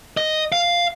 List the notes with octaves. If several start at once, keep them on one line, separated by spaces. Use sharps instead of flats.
D#5
F5